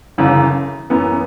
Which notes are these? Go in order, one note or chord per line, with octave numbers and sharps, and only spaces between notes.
G1 F#2 C#3 E3
F#2 E3 B3